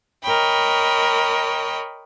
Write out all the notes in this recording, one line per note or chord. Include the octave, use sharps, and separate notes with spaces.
A#4 C#5 D#5 G5 B5